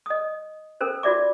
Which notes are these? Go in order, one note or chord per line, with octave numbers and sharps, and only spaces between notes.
D#5 D#6
C#4 A4 A#4 C5
F4 F#4 D5 E5 D6